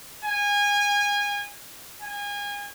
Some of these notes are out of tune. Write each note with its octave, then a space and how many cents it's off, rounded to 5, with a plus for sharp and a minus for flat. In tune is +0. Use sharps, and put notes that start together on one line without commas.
G#5 -25
G#5 -30